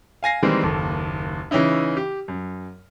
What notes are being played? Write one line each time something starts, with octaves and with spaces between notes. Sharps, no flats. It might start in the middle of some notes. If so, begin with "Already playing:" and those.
F5 G#5 A#6 C7
D#3 E3 G3 G#3 A#3 C4
F#1 D#2 A4
C#3 E3 C#4 D#4 E4
G4
F#2